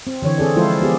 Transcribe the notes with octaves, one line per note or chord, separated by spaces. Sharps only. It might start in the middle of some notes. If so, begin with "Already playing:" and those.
C4
D3 E3 C#5
C4 G#4 A4 D5
F3 G#3 E4 F4 A4 C5
B3 G4 G#4